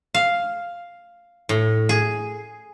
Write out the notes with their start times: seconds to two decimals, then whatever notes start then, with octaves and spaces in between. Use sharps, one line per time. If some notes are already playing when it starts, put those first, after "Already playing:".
0.14 F5
1.49 A2
1.89 G#4